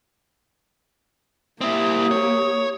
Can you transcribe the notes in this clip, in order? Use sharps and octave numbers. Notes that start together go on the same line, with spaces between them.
A#3 C4 E4 G4 D#6
C#5